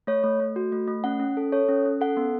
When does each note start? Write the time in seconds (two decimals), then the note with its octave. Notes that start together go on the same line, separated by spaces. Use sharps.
0.07 A3 C#5
0.24 A3
0.40 A3
0.56 F#4
0.72 A3
0.88 A3
1.04 C#4 F#5
1.20 C#4
1.37 A4
1.52 A4 C#5
1.69 C#4
1.85 C#4
2.01 A4 F#5
2.17 B3